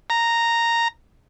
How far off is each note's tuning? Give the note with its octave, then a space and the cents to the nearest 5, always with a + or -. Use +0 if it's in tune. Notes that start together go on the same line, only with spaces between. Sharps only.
A#5 -5